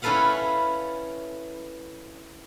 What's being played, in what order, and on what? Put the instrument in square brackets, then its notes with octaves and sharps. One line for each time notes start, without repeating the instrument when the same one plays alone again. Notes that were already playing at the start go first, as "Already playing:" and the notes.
[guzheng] C#4 E4 A4 B4 F5 F#5